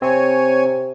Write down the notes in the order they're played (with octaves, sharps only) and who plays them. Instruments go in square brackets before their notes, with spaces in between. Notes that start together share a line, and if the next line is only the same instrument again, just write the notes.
[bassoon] C3 [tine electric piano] C4 [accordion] C#5 G#5